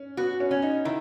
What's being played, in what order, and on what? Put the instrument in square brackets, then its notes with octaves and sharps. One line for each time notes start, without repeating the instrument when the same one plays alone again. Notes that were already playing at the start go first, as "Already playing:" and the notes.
Already playing: [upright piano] C#4
[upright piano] B3 [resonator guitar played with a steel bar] F#4
[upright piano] C#4
[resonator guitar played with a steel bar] C#4
[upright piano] D#4
[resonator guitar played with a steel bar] D#3 [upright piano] E4